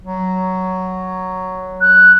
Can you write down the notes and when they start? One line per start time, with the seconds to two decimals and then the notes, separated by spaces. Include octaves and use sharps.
0.03 F#3
1.81 F#6